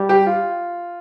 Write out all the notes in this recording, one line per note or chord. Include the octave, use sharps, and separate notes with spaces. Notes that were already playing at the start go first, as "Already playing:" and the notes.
Already playing: G3
G4
F4